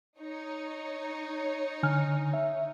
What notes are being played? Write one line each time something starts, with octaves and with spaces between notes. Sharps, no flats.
D#4 C#5
D3 G#5 F6
E5